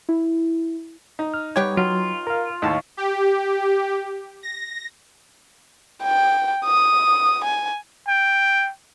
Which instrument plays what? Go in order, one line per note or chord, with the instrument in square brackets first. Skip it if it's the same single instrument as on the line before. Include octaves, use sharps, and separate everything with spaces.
[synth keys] E4
[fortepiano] D#4
[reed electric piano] F6
[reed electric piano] G3 G5 G#6 [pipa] B3 G4 C#5
[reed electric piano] F#3 [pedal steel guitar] F4
[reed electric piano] A#4 F5
[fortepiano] D#2 A2 A5 [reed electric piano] D#5 F5 C#6
[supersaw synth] G4
A#6
[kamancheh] G5
D#6
G#5
[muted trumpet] G5